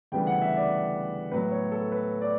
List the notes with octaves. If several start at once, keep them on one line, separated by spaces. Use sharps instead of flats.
D2 C#3 E3 G3 B3 G5
F#5
E5
D5
A2 F#3 B3 B4
C#5
A4
B4
D5